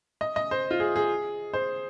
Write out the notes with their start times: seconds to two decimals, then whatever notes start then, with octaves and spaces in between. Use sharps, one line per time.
0.21 D#5
0.36 D#5
0.51 C5
0.71 F4
0.80 G#4
0.96 G#4
1.53 C5